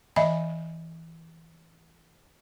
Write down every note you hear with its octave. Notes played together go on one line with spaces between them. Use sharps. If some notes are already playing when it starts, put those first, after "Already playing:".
E3 D#5 E5 G#5 B5